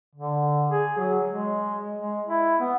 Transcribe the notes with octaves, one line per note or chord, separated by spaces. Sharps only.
D3
G#4
F#3
G#3
G#3
E4
B3